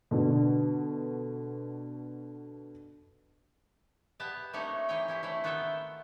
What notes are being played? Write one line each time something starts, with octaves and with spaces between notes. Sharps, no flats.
B2 D3
B3 G4 A5
A3 A#3 C4 D#4 G4 C#5
E3 C4 D#4 C#5 G5
C#4 E4 G4
A3 C4 E4
D#3 B3 F4 E5 F#5 G5